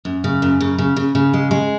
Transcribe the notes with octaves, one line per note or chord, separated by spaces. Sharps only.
F#2
C#3
F#2
C#3
C#3
C#3
C#3
G#3
G#3